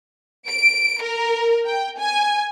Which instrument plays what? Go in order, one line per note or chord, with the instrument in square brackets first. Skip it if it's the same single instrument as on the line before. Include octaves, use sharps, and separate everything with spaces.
[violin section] D7
A#4
G5
G#5